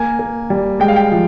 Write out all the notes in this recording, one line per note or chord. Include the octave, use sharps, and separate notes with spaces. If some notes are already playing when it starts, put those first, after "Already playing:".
Already playing: A#3 G#5
A#3
G3
G#3 G5
F5
G5
F3